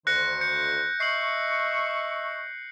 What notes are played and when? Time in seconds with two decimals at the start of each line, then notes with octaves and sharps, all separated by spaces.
0.07 D2 D#3 C5 F#6 A#6 C#7
0.41 G6 C#7
1.00 D#5 E5 C#6 C7 F#7